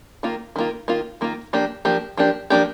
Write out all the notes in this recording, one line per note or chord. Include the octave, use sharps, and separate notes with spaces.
D#3 A#3 F4
D#3 A#3 F4
D#3 A#3 F4
D#3 A#3 F4
F3 A#3 D4 G4
F3 A#3 D4 G4
F3 A#3 D4 G4
F3 A#3 D4 G4